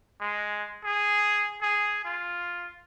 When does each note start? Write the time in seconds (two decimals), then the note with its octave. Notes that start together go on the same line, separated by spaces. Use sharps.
0.21 G#3
0.84 G#4
1.62 G#4
2.05 F4